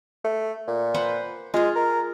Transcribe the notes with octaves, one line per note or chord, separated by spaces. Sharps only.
A3
A#2
B4 C5 F#5
G#3 F4 G#4
A#4